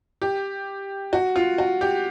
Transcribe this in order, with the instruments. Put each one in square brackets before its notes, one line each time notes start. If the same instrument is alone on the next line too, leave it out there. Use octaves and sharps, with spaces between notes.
[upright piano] G4
F#4
F4
F#4
G4